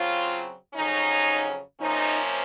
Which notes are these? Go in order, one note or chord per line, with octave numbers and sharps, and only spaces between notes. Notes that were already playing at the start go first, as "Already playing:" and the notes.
Already playing: C#3 F#3 C4 F4
F2 C#3 F#3 C#4 D#4
C3 F3 A#3 C#4 D#4